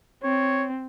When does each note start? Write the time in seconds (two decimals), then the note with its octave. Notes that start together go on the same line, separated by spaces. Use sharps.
0.23 C4 C#5